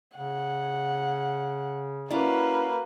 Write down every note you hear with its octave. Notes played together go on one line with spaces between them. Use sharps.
C#3 F#5
A#3 C#4 E4 F#4 B4 D5